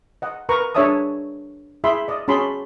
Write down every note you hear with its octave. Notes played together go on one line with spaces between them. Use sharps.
D#5 F#5
A#4 B4 A#5 C#6
D4 G#4 C#5 E5 A5 D#6
E4 G#4 E5 B5 C6
D5 D#5
C#4 F#4 G#4 A5 B5 C6